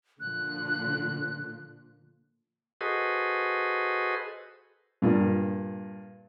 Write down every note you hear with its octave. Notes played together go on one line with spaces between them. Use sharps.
A#2 D3 F3 F#6
F#4 G#4 A4 B4 C5 D#5
G2 A#2